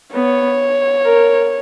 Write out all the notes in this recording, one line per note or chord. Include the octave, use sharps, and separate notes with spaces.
B3 C#5
A#4